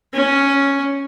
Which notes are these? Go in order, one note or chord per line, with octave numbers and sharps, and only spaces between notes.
C#4